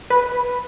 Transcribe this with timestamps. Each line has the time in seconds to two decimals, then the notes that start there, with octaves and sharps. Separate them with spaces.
0.10 B4